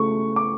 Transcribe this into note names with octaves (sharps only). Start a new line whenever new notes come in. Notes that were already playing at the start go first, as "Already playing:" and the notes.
Already playing: C#3 A3 C#6
D6